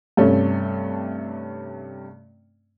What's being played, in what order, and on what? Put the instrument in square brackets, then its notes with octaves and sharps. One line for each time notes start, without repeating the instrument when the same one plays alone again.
[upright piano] G2 C3 A3 C#4